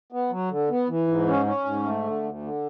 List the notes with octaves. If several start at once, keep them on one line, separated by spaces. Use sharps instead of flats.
B3
F#3
D3
B3
E3
G#2
C#4
C#4
G#2
A3
D3
D2
D3